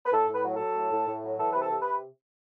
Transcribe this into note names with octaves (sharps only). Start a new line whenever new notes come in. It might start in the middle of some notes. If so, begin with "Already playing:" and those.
B4
A2 A4
A2
B4
F#3
F#3 A4
A2
A2
A2
F#3
E3 A4
C3 B4
A4
C3
B4